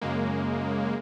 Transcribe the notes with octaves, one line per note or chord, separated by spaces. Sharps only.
F#2 C#3 G#3 A#3